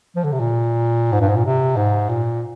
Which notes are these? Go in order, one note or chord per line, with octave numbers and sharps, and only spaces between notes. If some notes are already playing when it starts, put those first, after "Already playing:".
F3
D3
C3
A#2
G#2
G2
G#2
A#2
C3
G#2
A#2